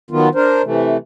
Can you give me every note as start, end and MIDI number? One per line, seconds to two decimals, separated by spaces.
0.11 0.29 51
0.11 0.29 54
0.11 0.29 59
0.11 0.29 65
0.35 0.62 62
0.35 0.62 70
0.35 0.62 72
0.64 0.97 48
0.64 0.97 52
0.64 0.97 57